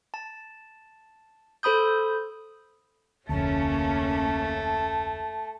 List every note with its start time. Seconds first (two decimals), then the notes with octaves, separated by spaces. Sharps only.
0.14 A5
1.63 A4 C5 B5 D#6 G6
3.29 F1 D2 A3 A#3 C#4 A5